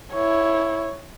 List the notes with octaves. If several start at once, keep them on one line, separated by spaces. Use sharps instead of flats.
E4 C#5